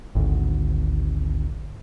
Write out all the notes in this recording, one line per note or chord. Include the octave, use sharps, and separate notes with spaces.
G#1 D2